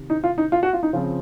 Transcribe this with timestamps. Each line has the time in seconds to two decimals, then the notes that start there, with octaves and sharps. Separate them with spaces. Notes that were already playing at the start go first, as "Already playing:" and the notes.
Already playing: C3 D#3
0.10 D#4
0.24 F4
0.38 D#4
0.52 F4
0.63 F#4
0.73 F4
0.83 D#4
0.93 C#3 F3 C4 F4